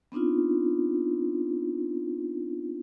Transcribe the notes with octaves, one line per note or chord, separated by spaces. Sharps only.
B3 C4 D4 D#4 F4